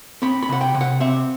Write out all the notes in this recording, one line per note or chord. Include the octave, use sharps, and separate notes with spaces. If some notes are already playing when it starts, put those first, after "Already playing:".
C4 B5
B5
C3 F#5
G5
C3
F#5
C4 E5